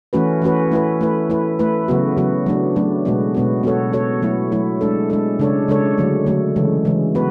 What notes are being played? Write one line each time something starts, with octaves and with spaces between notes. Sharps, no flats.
E3 A3 C#4 F#4 B4
E3 A3 C#4 F#4 B4
A3 E4 B4
A3 E4 B4
A3 E4 B4
A3 E4 B4
C#3 F#3 B3 F#4
C#3 F#3 B3 F#4
F#3 A3 D4
F#3 A3 D4
B2 G#3 B3 F#4
B2 G#3 B3 F#4
B3 F#4 A4 C#5
B3 F#4 A4 C#5
F#3 A3 E4
F#3 A3 E4
G#3 D4 A4
G#3 D4 A4
C#3 G#3 D4 A4 C#5
C#3 G#3 D4 A4 C#5
D3 F#3 A3
D3 F#3 A3
C#3 E3 G#3
C#3 E3 G#3
B3 F#4 B4